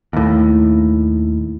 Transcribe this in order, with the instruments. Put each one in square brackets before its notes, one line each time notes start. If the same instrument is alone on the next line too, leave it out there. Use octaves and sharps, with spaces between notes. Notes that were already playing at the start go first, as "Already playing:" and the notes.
[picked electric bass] D#2 A2